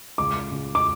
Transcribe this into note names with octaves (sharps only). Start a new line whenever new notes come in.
C#2 D6
C#2
D6